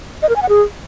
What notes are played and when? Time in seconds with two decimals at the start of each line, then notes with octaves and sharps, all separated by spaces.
0.22 D#5
0.29 A#4
0.36 G#5
0.42 F#5
0.49 G#4